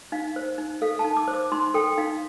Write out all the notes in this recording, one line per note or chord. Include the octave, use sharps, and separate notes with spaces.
D#4 F5
C5
D#4
A4 F5
A5
D#4
D6
C5
D6
D#4 C6
A4 G5
D#4 F5